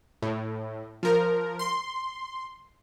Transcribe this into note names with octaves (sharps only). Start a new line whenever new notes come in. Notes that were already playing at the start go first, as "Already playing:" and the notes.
A2
F3 A#4
C6